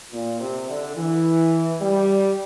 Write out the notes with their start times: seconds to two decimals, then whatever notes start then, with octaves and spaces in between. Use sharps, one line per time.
0.12 A#2
0.40 C3
0.69 D3
0.97 E3
1.81 G3